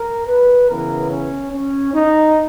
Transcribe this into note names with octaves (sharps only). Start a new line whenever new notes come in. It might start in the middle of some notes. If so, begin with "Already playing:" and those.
Already playing: A#4
B4
C#3 E3 B3 A#4
C#4
C#4
D#4